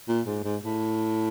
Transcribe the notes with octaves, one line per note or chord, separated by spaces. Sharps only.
A#2
G#2
G#2
A2